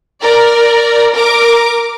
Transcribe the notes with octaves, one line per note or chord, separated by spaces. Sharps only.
A#4 D5
A#4 D6